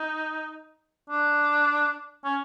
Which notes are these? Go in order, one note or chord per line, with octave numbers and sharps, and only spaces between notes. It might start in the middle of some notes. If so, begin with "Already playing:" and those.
Already playing: D#4
D4
C#4